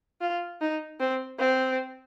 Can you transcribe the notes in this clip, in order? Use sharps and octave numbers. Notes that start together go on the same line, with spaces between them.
F4
D#4
C4
C4